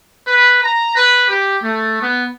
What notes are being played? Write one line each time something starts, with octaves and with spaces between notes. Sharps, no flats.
B4
A#5
B4
G4
A3
B3